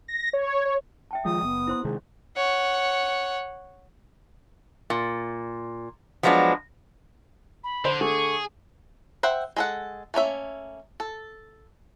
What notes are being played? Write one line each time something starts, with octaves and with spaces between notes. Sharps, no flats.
A#6
C#5
C#5
E5 G5 A5
D#3 F3 G#3 F4 D#6
F#1 B3
E4 C5 C6
C3 D#3 G#3 G#4
C#5 F#5
A#2
F3 F#3 G#3 B3 D4
B5
D3 C5
D3 A3 G#4 C#6
C5 E5 F#5 G5
G#3 A4 F#5
A3 A#3 C#4 E5
A4